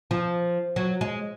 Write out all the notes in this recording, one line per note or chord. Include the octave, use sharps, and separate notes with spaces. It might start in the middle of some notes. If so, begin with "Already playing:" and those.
F3
F#3
G#3